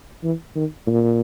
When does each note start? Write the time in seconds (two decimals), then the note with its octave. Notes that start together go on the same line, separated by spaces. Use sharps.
0.24 E3
0.55 D#3
0.87 A#2